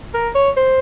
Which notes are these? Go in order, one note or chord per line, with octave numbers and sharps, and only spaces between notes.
A#4
C#5
C5